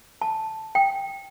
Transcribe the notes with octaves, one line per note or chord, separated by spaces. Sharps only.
A5
G5